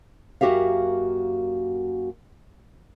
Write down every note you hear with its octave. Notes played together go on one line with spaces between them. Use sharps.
F#2 A#3 F#4 G4 E5 F5